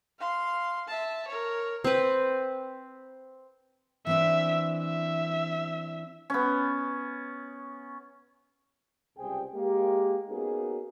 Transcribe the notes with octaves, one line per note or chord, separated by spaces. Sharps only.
F5 C6
E5 A5
A#4 C#5
C4 B4
E3 C4 D4 E5
E5
B3 C#4
C#2 C3 G3 G#4 C5 G5
G#3 A#3 G4
A#3 B3 C#4 D#4 F#4 G#4